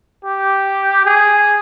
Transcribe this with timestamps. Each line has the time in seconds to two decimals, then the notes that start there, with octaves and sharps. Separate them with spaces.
0.24 G4
1.05 G#4